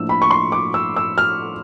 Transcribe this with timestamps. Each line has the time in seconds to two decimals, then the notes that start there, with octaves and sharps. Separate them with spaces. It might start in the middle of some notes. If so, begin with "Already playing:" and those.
Already playing: A2 F3 A#3 D4 E6
0.09 B5
0.22 C#6
0.31 C6
0.52 D6
0.74 E6
0.96 E6
1.18 F6